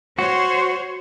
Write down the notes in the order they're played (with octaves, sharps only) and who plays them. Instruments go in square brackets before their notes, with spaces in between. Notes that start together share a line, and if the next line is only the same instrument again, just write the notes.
[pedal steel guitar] F#4 [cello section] C5 C#5